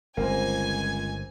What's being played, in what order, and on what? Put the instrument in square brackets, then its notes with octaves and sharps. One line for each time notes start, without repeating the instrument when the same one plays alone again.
[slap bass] G1 [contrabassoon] C#2 [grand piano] A#3 C4 C5 [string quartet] G#5 G#6